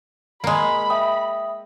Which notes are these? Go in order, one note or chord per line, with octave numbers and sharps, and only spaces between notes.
G#3 A#3 B5
E5 G5 D#6